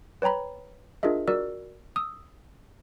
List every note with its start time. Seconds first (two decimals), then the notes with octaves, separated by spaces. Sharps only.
0.22 B4 C#5 G5 A#5 B5
1.03 D4 F4 G#4 A#4 D#5 E5
1.28 F#4 A#4 D5 E6
1.96 D#6 E6